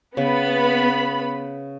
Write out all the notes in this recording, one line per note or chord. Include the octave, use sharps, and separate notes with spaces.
C#3 B3 B5